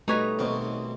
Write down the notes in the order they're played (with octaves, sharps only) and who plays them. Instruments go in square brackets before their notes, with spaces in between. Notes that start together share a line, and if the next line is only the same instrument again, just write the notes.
[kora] B2 G3 B4 [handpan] A3 [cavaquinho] D#4 C#5 A#5
[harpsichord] B1 B2 C4 [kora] D#3